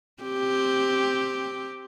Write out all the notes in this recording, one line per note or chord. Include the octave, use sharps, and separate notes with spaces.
C4 G4